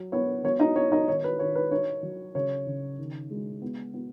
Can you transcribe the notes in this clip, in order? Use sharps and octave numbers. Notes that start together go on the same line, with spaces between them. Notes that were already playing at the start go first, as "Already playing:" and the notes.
Already playing: F#3
B3 C#5
B3 C#5
D#4 D#5
B3 C#5
D#4 D#5
D#3 C#5
B4
D#3 C#5
B4
D#4 C#5
F#3
C#3 C#5
C#3
D#3
G#3
B3
B3